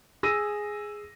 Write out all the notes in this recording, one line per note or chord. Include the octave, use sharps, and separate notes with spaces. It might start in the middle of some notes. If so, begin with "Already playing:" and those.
G#4 E6 A#6 D#7